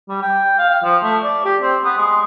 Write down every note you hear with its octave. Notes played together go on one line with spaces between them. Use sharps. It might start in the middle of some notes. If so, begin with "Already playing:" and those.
G3
G5
F5
F5
F3
A3
D5
G4
C4
B3
G#3